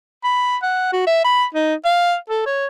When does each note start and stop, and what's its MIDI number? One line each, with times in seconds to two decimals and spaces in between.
0.24 0.57 83
0.63 0.88 78
0.93 1.02 66
1.07 1.20 76
1.25 1.45 83
1.54 1.74 63
1.85 2.15 77
2.29 2.42 69
2.46 2.67 73